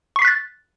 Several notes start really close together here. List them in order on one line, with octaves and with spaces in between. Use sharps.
C#6 C7 B6 F#6 A6